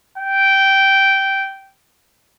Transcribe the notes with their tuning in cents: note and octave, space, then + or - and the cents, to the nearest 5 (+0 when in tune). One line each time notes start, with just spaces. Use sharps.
G5 -10